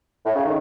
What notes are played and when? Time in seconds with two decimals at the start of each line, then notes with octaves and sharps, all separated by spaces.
0.26 A2
0.35 C#3
0.45 D#3